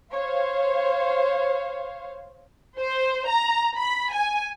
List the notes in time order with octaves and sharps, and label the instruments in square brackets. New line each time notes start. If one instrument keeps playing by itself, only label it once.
[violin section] C5 C#5 F5
C5
A#5
B5
G#5